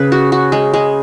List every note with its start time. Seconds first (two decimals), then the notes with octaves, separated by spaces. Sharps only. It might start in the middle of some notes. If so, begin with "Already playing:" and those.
Already playing: C#3 B4
0.12 F#4
0.32 F#4
0.52 G#3
0.74 G#3